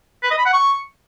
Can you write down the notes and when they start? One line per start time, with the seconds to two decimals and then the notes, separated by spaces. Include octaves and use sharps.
0.23 B4
0.31 D#5
0.38 B5
0.46 F#5
0.53 C#6